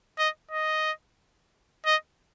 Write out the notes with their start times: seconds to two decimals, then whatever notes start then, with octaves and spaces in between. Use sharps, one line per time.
0.19 D#5
0.51 D#5
1.86 D#5